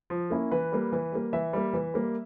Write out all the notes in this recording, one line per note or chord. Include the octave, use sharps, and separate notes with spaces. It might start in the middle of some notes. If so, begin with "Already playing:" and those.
F3
A#3 C#4 E4
E3 B4
G3 A#3
E3
G3 A#3
E3 E5
G3 A#3
E3
G3 A#3